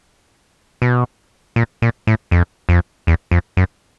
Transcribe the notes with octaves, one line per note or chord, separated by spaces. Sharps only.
B2
A#2
A#2
A2
F2
F2
E2
F2
F#2